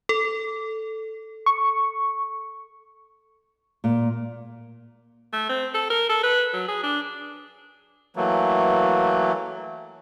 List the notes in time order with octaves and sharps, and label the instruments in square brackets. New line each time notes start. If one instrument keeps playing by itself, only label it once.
[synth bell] A4
[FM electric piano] C#6
[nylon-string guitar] A#2
[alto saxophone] A3
C4
A4
A#4
A4
B4
F#3
G#4
D4
[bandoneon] E3 F#3 A3 A#3